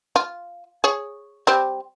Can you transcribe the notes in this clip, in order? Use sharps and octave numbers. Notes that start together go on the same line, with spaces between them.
F4
G#4 C#5
G3 C4 G4